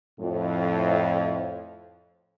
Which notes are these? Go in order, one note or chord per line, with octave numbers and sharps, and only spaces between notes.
F2 A2